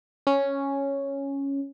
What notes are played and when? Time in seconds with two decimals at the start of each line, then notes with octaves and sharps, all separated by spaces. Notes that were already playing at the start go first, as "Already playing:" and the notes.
0.27 C#4